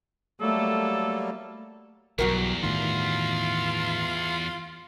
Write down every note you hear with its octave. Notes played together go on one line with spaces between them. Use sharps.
F#3 G3 A3 A#3 A4
B1 E2 G2 D#3 F#3 F#4 A#4
A2 D#3 F4